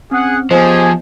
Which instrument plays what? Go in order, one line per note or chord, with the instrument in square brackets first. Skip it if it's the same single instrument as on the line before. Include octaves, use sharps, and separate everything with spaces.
[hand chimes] C4 C#4 [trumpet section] G#4 F#5
[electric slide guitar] F3 [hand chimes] B3 D#5 [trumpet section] G4 G#4 G#5 [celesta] C5